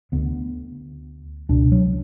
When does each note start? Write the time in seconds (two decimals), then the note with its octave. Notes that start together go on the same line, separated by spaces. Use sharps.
0.12 D2 D3 B3
1.49 C#2 B2 D4
1.72 F#3